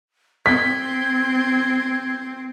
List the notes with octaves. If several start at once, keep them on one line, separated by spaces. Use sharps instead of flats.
C4 G#6 B6